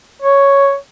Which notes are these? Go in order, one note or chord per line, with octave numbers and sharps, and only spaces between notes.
C#5